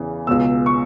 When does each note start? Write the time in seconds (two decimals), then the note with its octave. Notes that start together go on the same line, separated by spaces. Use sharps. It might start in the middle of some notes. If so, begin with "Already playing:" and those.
Already playing: E2 C#3 E3
0.27 C#2 B2 E6
0.66 C#6